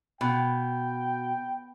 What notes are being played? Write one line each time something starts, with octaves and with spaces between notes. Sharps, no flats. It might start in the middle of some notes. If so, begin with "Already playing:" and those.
B2 G5